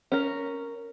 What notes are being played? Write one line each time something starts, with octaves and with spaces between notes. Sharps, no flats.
C#4 A#4